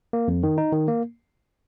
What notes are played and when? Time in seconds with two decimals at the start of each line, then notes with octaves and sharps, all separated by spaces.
0.13 A#3
0.28 F2
0.43 D#3
0.58 D#4
0.72 D#3
0.88 A#3